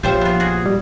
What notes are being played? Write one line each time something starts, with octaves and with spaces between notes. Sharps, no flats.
A#1 F3 F4 G4 C5 C#5 E5 G5
B3 F4
F#4 G#4
G3